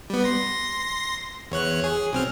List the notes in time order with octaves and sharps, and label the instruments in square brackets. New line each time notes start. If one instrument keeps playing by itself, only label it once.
[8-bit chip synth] G3 B3
C6 A#6
E2 C#5 F#6
G#4
B1 C4 F6